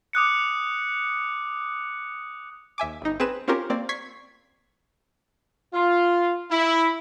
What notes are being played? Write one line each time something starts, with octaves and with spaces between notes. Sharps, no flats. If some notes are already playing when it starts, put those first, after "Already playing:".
D6 D#6 F#6 C#7
D#2 E5 G#5 D6
G1 D#4
C4 G#4 B4 E7
C4 C#4 F4 G4 A#4
A#3 C4 D5
C#6 G#6 B6 C7
F4
E4